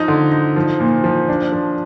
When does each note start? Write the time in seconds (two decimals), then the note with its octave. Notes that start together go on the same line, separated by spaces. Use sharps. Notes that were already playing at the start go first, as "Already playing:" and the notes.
Already playing: F3 D#4
0.08 D3
0.31 D#4
0.56 F3
0.80 A#2
1.04 F3
1.29 D4
1.53 F3